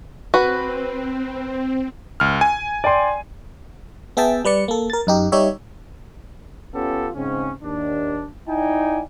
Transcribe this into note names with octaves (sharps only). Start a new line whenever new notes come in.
C4 F#4 B4
C#2 F6
G#5
D5 G5 C6
B3 G#4 E5 G5 A5
G3 B4 D5 C#7
A#3 A4
A#4 A6
F#2 D#4 G4
G3 D#4 G4 C#5 E5
B3 C#4 F4 G4 A4
G#2 C#3 C4 C#4
D#2 D4
D#4 E4 D5 G5 G#5